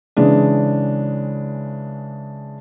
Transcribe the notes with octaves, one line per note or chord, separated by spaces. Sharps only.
C#3 E3 G#3 D4